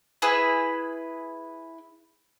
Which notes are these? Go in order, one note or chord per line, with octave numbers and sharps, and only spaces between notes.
E4 G#4 B4